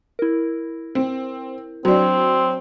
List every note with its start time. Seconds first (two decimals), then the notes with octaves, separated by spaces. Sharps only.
0.19 E4 A#4
0.95 C4
1.85 F#3 C4 D4